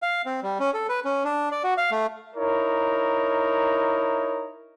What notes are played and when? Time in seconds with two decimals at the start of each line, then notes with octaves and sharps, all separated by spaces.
0.02 F5
0.26 C4
0.43 G3
0.60 C#4
0.74 A4
0.89 B4
1.05 C#4
1.24 D4
1.52 D5
1.64 F#4
1.78 F5
1.91 A3
2.35 D#4 E4 A#4 C#5